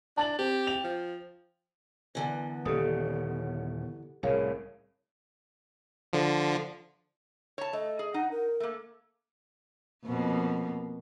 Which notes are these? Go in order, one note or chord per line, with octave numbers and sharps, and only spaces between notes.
D4 A5 A6 F#7
C4 G4
G5 F7
F3
F#2 D3 E3 B3
D#1 C#3 G4 A4 D#6
C2 A2 C#3 G#4 A#4 C#5 F5
D3 F3
C#5 A5
A3 D#5
G#4
D#4 F#5
A#4
A3 A#3
F2 B2 A#3